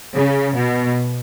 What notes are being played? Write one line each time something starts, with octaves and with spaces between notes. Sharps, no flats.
C#3
B2